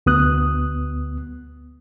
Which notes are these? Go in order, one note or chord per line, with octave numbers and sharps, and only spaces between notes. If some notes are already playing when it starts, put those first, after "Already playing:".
D2 B3 D#6 F#6